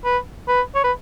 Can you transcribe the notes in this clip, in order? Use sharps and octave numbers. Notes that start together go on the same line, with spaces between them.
B4
B4
C#5
B4